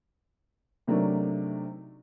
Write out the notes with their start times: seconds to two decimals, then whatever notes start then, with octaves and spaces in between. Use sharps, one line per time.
0.87 C3 F#3 A3 D4 D#4 A#4